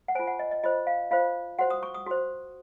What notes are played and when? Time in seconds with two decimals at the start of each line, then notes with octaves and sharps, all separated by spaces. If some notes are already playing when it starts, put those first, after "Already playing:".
0.08 F#5
0.15 F4 C5 G#5
0.27 F#5
0.39 D#5
0.51 D#5
0.64 F4 C5 D#5
0.87 F5
1.11 F4 C5 F5
1.59 F#4 C5 F#5
1.70 D#6
1.83 C#6
1.94 D#6
2.06 F#4 C5